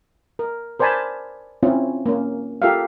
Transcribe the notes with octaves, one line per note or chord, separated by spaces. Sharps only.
A#4
A#4 C5 D5 G#5 A5 B5
C4 C#4 E4 F4
A#3 C#4
F4 G4 A4 A#4 E5 F5